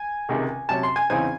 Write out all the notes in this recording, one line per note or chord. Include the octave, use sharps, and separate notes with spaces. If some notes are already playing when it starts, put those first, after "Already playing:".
Already playing: G#5
C#2 C3 D#3 G#3
C3 F#3 C#4 A5
C6
G#5
E2 C#3 E3 C4 D#4 G#5